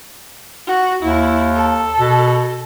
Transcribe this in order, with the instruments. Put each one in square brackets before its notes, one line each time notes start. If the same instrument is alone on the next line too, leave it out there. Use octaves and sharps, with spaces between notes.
[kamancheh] F#4
[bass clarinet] D#2 [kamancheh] E4
[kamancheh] A4
[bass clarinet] B2